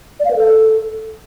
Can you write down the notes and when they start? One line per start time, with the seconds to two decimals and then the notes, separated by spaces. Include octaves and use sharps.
0.20 D5
0.25 F5
0.31 B4
0.36 A4